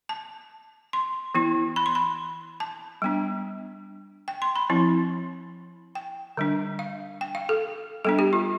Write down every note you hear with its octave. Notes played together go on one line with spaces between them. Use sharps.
A5
C6
E3 B3 E4
B5
C6
B5
A5
G3 B3 D4
G5
C6
B5
F3 C4 E4
G5
D3 G3 D4
F5
G5
F5
A4
G3 B3 D4 A4
G4
F4